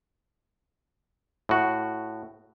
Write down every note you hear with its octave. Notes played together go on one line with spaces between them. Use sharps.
A2 F#4